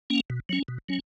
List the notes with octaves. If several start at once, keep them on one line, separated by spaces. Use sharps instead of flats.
A#3 C#4
B2
F#3 C#4
B2
F#3 C#4